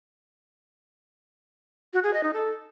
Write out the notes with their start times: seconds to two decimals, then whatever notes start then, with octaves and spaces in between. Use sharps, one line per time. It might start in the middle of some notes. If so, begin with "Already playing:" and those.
1.94 F#4
2.04 G#4
2.14 D#5
2.24 D#4
2.34 A4